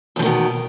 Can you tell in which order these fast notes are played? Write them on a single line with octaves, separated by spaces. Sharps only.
E2 F3 D#3 B2